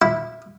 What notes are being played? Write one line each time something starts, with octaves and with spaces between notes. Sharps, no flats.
E4